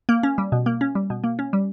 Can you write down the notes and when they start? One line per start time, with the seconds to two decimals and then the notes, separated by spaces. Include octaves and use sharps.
0.09 A#3
0.23 C#4
0.38 G3
0.52 B2
0.66 A#3
0.81 C#4
0.95 G3
1.10 B2
1.24 A#3
1.39 C#4
1.53 G3